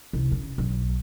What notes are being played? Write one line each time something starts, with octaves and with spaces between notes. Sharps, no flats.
C2
C#3
B1